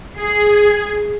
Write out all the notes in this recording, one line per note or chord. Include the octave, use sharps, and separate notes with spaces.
G#4